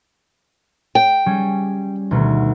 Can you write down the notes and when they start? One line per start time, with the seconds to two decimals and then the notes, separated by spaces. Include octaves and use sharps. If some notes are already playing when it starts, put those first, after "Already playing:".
0.95 G5
1.26 G3 C#4 G#4
2.11 D2 B2 D#3